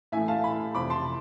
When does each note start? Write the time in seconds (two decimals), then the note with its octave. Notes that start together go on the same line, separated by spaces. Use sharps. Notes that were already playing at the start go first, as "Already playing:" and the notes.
0.12 A2 E3 A3 E5 G#5
0.28 F5 A5
0.44 G#5 B5
0.75 F2 C3 E3 B5 D6
0.90 A5 C6